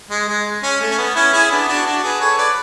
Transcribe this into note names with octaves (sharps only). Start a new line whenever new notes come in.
G#3
G#3
C#4
A3
C#4
B3
C#4 E4
E4 G#4
B3 D4
D4 F#4
D4 F#4
G#4 B4
A4 C#5
B4 D5